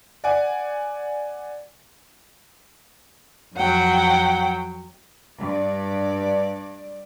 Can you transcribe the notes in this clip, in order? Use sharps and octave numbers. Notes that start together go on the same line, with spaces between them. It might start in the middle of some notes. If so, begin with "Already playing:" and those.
D5 F#5 G#5
F2 F#3 F#5 G5
G2 D5